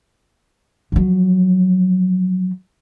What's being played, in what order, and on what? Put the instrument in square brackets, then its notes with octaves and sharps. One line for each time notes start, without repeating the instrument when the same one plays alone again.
[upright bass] F3 F#3